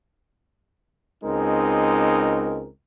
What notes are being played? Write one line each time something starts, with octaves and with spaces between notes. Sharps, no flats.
C#2 G#3 C4 D#4 A#4